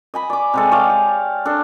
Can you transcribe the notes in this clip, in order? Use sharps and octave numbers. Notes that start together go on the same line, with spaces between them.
D#5 G#5 B5
D5 D6
C3 G#3 A4
G#4 C#5 D5 F5
G4
D4 A4